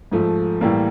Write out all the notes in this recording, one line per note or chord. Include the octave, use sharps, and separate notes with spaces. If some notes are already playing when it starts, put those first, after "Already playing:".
G#2 F3 A3
A2 E3 G3 A#3